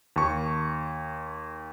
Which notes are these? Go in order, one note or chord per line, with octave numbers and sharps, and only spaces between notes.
D#2 C#6